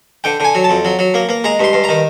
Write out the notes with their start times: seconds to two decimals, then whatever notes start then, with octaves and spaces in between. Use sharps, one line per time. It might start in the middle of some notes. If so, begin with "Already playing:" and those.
0.24 D3 G5
0.40 D3 G#5
0.55 F#3
0.64 A5
0.70 F2
0.85 F#3
0.99 F#3
1.14 A#3
1.29 A#3
1.44 G#3 A#5
1.59 G2 C6
1.73 G2
1.84 A#5
1.89 D#3